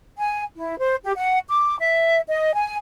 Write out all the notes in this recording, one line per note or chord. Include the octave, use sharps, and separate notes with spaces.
G#5
E4
C5
G4
F#5
D6
E5
D#5
G#5